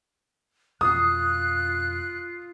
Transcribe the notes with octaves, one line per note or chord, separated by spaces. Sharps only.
F2 B2 F4 D#6 F#6